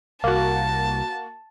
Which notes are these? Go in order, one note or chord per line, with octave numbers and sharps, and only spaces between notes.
C2 A#3 F#4 A5